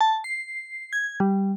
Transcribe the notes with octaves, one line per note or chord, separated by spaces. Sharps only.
A5
C7
G#6
G3